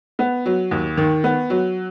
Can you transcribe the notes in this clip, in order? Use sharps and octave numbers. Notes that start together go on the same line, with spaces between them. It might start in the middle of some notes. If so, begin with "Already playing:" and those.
B3
F#3
D#2
D#3
B3
F#3